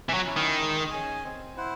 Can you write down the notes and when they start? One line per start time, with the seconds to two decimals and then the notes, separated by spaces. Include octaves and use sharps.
0.09 E3
0.14 F#3
0.25 C#4 E4
0.36 D#3
0.58 G#3
0.91 C#4 G#4 D#5 G#5
1.24 C4
1.57 E4 C5 F#5